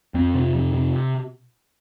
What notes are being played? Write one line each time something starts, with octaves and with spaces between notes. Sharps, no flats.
F2 C4
C3
F2
C3